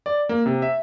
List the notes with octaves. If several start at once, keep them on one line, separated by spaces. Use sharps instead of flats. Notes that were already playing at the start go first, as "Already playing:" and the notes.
D5
A#3
C3
E5